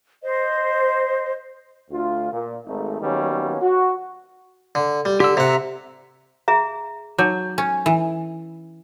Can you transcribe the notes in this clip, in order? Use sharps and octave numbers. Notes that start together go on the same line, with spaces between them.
C5 D#5
D2 F4
A#2
G#1 A3 D#4
D#3 F#3 G3 A#3 B3 C#4
F#4
D3
G3
D3 G4 E6
C3 E5 F#5 A#5
G#4 E5 A#5
F#3 D#4 C#5 D6
C#4
E3